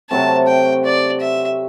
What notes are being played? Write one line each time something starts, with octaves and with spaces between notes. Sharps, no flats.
C3 F#3 A3 C4 A5
G5
D5
E5